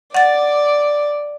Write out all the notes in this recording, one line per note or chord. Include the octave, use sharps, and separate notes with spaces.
D5 F#5 A6